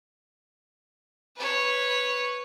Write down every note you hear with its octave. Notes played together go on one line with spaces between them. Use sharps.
B4 C#5